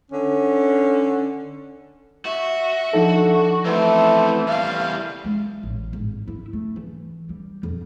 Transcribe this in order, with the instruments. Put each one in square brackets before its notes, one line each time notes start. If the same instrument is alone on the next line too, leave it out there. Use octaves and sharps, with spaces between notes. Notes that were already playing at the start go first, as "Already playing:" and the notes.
[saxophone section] D3 C#4
[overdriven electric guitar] F#4 [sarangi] E5
[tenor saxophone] D3 [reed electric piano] F3 D#4 A4
[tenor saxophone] E3 [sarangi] A3 [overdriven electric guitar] B3 C4
[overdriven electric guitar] E2 G3 [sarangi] F5
[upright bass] G#3
A1
G#1
E4
A3
E3
G3
F2